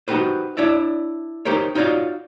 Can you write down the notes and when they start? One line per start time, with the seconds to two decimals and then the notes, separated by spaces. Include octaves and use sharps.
0.08 D#4 F#4 G4 B4 C5
0.57 D4 E4 C#5 D5 E5
1.45 D#4 G4 A#4 C5 C#5
1.75 D#4 F4 F#4 C#5 D5 F5